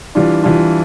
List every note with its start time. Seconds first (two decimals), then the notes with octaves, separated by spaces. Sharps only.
0.15 E3 G3 D4 F4
0.43 E3 G3 D4 F4